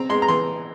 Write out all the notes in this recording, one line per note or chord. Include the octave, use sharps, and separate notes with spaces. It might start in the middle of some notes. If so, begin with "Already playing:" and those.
Already playing: C4 A#5
G#3 C6
A#5
E3 C6